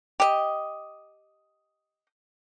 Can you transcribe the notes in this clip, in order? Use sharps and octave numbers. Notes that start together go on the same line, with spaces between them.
G4 D#5